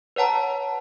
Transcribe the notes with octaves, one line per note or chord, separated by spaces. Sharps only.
B4 C#5 F#5 A5 A#5